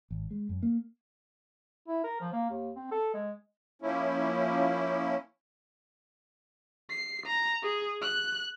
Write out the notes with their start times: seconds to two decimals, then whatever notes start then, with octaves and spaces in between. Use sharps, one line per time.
0.11 G#1
0.31 G#3
0.49 F#2
0.63 A#3
1.88 E4
2.04 A#4
2.20 F3
2.33 A#3
2.50 D#2
2.76 C4
2.91 A4
3.14 G#3
3.82 F3 A#3 C#4 E4
6.90 C7
7.26 A#5
7.63 G#4
8.02 F#6